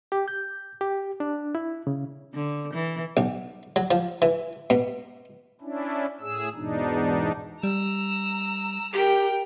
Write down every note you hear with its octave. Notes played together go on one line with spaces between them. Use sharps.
G4
G6
G4
D4
E4
C#3
D3
E3
B1
F#3
F3
E3
B2
C#4 D4 E4
A2 G#4 E6
E2 G#2 B2 D4 D#4
G3 A#5 E6
G4 A#4 G5